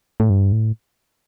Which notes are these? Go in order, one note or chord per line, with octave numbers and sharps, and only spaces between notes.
A2
G2
A2